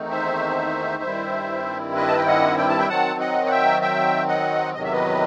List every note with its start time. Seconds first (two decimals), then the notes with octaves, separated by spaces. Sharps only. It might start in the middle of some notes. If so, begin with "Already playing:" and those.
Already playing: E2 D#3 A3 C4 D#4
0.11 C5 E5
1.03 G2 D#3 G3 C4 E4
1.96 B4 D#5
2.08 A5
2.17 G5
2.27 D#5 F#5
2.58 G5
2.69 A5
2.78 E5 G5
2.89 D#3 F#3 C4 F#5 A5
3.20 D#5 F#5
3.47 F#5
3.51 E5 G5
3.82 E5 G5
4.28 D#5 F#5
4.75 E2 C3 D#3 F#3 D#5
4.84 E5
4.92 B4 D#5